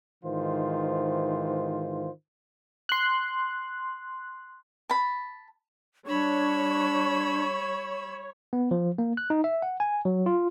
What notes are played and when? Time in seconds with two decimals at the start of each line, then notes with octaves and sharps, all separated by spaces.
0.24 G#2 D#3 E3 F4 C5
2.89 C6 F#6
4.90 A5 B5
6.07 G3 D4 C#5 B5 E6
8.53 B3
8.71 F3
8.98 A#3
9.17 F#6
9.30 D#4
9.44 E5
9.62 F#5
9.80 G#5
10.05 F#3
10.26 F4